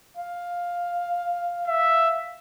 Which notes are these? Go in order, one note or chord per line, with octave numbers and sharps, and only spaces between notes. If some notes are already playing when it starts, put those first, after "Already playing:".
F5
E5